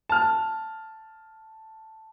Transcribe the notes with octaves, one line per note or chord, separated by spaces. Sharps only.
A5 F6